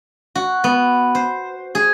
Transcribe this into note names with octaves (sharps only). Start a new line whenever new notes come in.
F#4
B3
C5
G#4